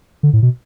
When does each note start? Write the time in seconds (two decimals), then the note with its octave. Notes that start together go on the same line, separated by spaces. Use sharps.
0.23 D3
0.33 A2
0.42 B2